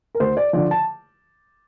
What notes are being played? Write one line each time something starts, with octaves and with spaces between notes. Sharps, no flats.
A#4
D2 C5
D5
D3 F3 D5
A5